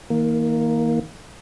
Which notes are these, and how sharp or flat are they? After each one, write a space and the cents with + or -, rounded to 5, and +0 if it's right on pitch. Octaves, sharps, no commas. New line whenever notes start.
D#3 +40 A#3 +0